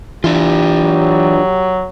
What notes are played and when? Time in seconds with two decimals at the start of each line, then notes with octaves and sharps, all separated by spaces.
0.24 E3 D4 F4 G4
0.84 F#3